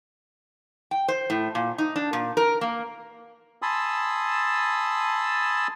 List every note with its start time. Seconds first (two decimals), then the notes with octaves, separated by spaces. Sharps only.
0.91 G5
1.08 C5
1.30 A2
1.55 A#2
1.78 D#4
1.96 D4
2.13 A#2
2.37 A#4
2.61 A#3
3.62 G#5 A5 B5 C6 D#6 E6